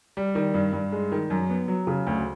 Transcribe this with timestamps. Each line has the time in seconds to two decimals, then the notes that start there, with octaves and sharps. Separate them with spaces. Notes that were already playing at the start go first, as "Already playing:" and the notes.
0.17 G3
0.35 D#3
0.54 G2
0.73 G2
0.92 G#3
1.12 D#3
1.30 F#2
1.49 B3
1.68 F#3
1.87 C#3
2.07 D2